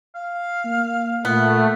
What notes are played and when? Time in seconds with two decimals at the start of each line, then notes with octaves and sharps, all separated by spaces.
0.15 F5
0.65 A#3
1.25 A#2 A3 B3